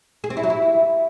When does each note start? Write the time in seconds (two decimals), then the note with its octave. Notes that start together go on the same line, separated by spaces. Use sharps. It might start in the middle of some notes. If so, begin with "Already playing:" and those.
0.24 G#4
0.30 C4
0.37 E4
0.43 F#3
0.50 E4